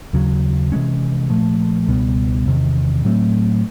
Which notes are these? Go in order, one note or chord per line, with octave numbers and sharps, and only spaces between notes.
D#2 C#3 F#3
C3 E3 G#3 C#4
A#2 F3 A3
C#2 B2 G3 B3
E2 C3 D#3
A2 F#3 A3 C4